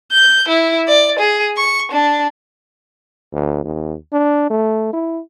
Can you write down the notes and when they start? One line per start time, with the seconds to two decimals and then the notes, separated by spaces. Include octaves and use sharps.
0.12 G6
0.48 E4
0.88 D5
1.19 G#4
1.57 C#6
1.92 D4
3.32 D2
3.64 D#2
4.13 D4
4.50 A3
4.93 E4